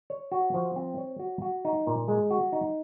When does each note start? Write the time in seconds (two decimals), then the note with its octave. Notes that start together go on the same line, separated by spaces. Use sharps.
0.10 C#5
0.32 F#4
0.54 F3
0.76 C4
0.98 C#5
1.19 F#4
1.42 F#4
1.65 D#4
1.87 A#2
2.08 G#3
2.30 F#4
2.53 D#4